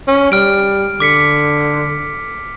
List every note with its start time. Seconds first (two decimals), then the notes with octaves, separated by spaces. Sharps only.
0.08 C#4
0.32 G3 F6 D7
1.00 D3 D6 B6 C#7